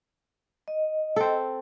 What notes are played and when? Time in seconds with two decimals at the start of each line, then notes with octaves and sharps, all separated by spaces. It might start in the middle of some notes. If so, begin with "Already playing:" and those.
0.68 D#5
1.16 C4 A4